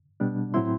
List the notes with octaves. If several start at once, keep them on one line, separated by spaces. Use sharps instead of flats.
B2 G3 B3 D4
A2 F#3 C4 E4 C6